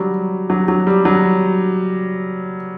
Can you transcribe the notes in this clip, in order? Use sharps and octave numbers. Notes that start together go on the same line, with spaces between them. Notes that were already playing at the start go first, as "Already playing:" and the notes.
Already playing: F#3 G3
F#3
F#3
G3
F#3